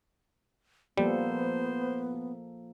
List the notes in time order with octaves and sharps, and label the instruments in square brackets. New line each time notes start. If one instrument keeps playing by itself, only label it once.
[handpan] F3 A#3 A4 [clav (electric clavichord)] G3 [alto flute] B3 [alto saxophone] C5